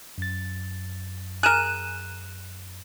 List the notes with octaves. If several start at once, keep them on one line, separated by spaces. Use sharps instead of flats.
F#2 A6
G#4 A#4 F#6 D#7 E7